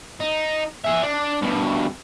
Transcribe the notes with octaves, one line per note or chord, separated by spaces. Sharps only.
D#4
G#4 E5
D4
G2 B2